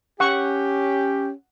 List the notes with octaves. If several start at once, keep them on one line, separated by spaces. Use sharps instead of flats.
C#4 G4 F#5 C#6